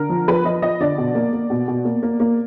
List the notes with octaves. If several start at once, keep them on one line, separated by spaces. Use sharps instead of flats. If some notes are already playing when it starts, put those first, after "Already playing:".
Already playing: D3 A#4
F3
F3 B4
F3 D#5
F3 D#5
D3 D5
B2
A#3
A#3
B2
B2
A#3
A#3
A#3